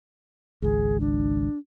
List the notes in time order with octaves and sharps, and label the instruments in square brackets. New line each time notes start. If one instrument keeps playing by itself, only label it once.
[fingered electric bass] G#1 C#2 [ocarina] G#4
[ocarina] D4